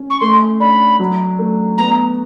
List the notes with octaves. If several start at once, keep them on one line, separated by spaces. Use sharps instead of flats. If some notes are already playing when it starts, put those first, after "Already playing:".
Already playing: C#4
C#6
A3 C6
D4 B5
F#3
A3
B3 A#5